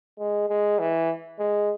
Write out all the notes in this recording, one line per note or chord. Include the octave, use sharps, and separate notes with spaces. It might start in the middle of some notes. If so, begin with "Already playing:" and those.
G#3
G#3
E3
G#3